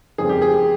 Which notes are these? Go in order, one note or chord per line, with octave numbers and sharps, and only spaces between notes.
F2 C#3 G3 C4 G#4
G4
G#4